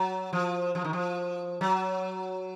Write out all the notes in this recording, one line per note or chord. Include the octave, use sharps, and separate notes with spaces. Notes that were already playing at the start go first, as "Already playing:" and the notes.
Already playing: F#3
F3
F3
D#3
F3
F#3